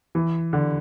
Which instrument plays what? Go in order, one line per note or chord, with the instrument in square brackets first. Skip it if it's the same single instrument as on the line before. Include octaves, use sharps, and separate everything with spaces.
[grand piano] E3
D3